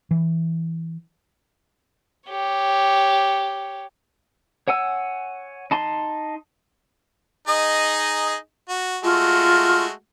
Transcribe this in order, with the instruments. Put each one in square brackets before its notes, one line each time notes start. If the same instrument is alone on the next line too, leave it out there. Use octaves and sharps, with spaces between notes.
[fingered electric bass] E3
[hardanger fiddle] G4 C#5
[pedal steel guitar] C#5 F#5 G#5 E6
D#4 A5 C6
[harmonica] D#4 G#4 D#5
F#4
[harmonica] G#3 A3 F#4 [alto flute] F4